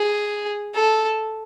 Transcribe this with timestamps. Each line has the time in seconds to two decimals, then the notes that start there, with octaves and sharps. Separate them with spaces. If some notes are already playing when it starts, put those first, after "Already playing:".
Already playing: G#4
0.75 A4